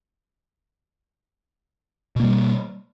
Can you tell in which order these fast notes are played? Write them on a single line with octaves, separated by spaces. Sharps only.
B2 A#3 G3